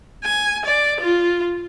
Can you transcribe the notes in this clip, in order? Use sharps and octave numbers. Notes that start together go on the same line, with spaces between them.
G#5
D5
F4